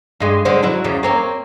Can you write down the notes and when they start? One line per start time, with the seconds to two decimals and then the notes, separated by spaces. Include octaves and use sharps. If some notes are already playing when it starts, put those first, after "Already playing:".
0.20 G2 G#3
0.45 D3 G#3 C5
0.63 F#3 E4
0.84 E2 C#3
1.03 A#3 C4 C#5